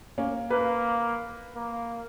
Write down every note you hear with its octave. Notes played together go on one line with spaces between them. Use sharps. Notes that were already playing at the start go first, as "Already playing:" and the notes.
A#3 C#4
A#3 B4
A#3